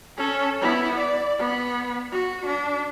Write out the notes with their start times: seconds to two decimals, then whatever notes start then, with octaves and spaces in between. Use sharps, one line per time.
0.17 C#4 A4
0.61 B3 E4
0.98 D5
1.38 B3
2.12 F#4
2.46 D4